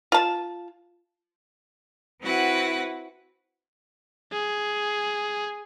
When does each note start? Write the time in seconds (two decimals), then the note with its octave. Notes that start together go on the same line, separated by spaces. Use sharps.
0.12 F4 A5
2.22 C4 E4 F#4 B4 F#5
4.32 G#4